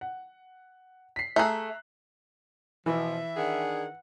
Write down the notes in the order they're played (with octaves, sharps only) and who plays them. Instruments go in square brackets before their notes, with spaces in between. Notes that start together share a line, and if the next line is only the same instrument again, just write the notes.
[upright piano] F#5
B6 C7
[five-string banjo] A3 G#4 [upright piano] E5 A#5 F#6
[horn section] B2 F3 [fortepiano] E3 [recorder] E5
[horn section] D#3 D4 G#4 [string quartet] F#5